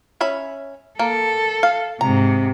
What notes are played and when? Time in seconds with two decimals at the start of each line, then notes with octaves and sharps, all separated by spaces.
0.21 C#4 E5 B5
0.99 A#3 A4
1.63 F5
2.01 G#2 C3 A#5